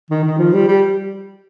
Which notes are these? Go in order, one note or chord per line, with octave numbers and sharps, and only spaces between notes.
D#3
D#3
F3
G3
G3